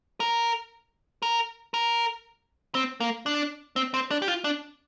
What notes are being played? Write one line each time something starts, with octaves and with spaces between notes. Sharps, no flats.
A#4
A#4
A#4
C4
A#3
D4
C4
C4
D4
G4
F4
D4